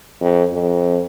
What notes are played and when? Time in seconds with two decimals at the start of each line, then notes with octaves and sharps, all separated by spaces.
0.21 F2
0.53 F2